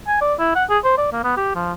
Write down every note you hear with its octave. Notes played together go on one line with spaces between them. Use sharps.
G#5
D5
E4
F#5
G#4
C5
D5
A#3
B3
G4
F3